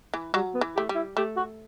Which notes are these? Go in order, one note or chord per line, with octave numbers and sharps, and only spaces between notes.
E3
F#3 G3
B3
E3
A3 G4
G3
E4
A3 G4
F#4